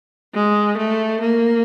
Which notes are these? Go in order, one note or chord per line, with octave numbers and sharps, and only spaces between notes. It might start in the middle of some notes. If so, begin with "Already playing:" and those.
G#3
A3
A#3